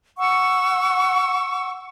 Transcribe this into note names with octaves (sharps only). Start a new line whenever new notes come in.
F#5 C#6 E6